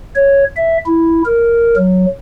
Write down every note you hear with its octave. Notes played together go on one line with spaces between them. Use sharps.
C#5
E5
E4
A#4
F#3